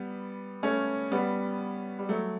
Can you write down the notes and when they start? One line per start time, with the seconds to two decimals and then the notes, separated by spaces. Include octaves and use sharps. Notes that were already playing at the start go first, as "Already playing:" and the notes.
Already playing: G3 B3
0.63 A3 C#4
1.12 G3 B3
1.99 G3
2.09 F#3 A3